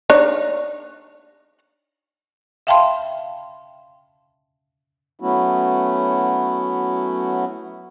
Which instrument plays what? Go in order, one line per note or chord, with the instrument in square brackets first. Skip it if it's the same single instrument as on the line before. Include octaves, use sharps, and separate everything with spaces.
[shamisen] D4 D#4 C#5
[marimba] E5 F5 G5 A5 B5 C6
[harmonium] F#3 A3 B3 C#4 E4 F#4